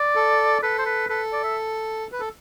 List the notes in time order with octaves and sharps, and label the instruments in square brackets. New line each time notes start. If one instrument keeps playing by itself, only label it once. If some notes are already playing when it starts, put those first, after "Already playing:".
Already playing: [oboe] D5
[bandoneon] A4
[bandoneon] A4 [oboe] B4
[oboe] C5
B4
[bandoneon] A4 [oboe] B4
[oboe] D5
E5
[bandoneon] B4
A4